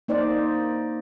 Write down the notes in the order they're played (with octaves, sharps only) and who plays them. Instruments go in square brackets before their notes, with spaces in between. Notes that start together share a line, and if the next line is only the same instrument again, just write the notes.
[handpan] A#3 D#4 C5 D5